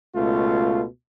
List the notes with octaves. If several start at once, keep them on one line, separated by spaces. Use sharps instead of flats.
C#2 B2 A3 F4